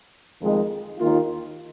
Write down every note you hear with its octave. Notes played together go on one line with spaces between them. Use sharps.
F2 D#3 G#3 D#4
D#2 D#3 A#3 F4